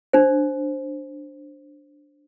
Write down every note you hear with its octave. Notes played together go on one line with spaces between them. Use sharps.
D4 C5